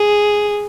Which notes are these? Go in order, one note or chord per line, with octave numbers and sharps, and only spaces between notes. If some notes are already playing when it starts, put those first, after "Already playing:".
Already playing: G#4